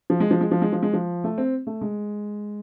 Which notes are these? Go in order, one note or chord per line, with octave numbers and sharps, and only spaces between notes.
F3
G#3
F3
G#3
F3
G#3
F3
G#3
F3
A3
C4
A3
G#3